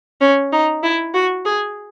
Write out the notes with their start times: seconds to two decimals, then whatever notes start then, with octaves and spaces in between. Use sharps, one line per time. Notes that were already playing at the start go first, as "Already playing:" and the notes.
0.21 C#4
0.52 D#4
0.83 E4
1.14 F#4
1.45 G#4